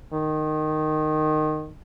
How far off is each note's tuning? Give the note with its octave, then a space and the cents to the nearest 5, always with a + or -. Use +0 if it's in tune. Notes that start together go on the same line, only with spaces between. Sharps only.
D#3 -15